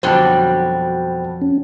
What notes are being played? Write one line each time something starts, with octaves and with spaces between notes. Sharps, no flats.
F2 B2 D3 F#3 G3 C5 G5 A5
C#4